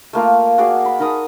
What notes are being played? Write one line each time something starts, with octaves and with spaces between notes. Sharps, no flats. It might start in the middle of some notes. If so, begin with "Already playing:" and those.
A3 A#3 F4
F#4 G#4 D5
B5
D#4 A#4 A5 D#6